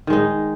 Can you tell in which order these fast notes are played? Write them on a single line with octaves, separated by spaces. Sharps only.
D#3 G#3 D#4